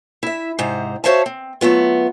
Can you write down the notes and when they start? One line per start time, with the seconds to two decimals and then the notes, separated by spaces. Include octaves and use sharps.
0.23 E4 E5
0.59 G#2 C3 C5 A#5
1.04 F#4 C5 C#5 E5 F5 A5
1.26 C4
1.61 F#3 A3 B3 F4